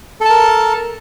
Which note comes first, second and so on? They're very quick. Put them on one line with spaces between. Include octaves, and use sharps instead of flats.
A4 A5 A#4